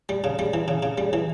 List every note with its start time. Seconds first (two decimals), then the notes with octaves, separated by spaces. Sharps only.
0.09 G3
0.24 C#3
0.39 G3
0.54 E3
0.68 C#3
0.83 C#3
0.98 G3
1.13 E3